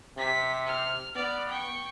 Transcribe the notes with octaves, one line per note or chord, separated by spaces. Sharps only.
C3 B6
F6
B3 D5 F6
G5 C#6